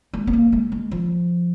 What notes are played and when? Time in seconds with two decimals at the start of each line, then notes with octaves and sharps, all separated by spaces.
0.13 G#3
0.27 B3
0.33 A#3
0.52 G#3
0.72 G#3
0.91 F3